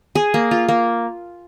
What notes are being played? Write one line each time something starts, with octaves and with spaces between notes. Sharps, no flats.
G#4
A#3
F4
A#3